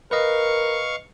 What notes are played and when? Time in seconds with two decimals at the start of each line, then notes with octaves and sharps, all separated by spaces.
0.11 A#4 B4 D#5 F5 C#6